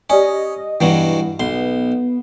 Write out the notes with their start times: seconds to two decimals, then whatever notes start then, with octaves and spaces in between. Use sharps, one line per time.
0.10 C#4 G4 D5 D#5 G#5
0.81 G2 B2 E3 F#3
1.40 B1 B3 C6